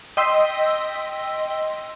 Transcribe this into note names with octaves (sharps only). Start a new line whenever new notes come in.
D#5 G5 C6 E6 B6